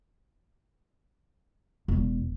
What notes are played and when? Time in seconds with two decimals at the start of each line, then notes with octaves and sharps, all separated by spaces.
1.88 E1